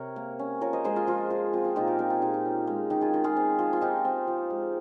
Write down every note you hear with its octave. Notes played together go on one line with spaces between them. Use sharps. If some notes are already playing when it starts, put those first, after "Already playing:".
Already playing: C3 A#4 C#5
A#3
C#4
F3 A#4 C#5
C5 D#5
G#3 G#4 C5
F4
F3 F4
F3
C4 F4
F4
A#2 D#4 G4
G4 A#4
C4 G4 A#4
F4 G#4
A#2 D#4 G4
D#4
C#4
G#3
D#3 D#4 G4
F4 G#4
D#3
F4 G#4
C4
F3
F4
C4 D#4 G4
C4
F3
G#3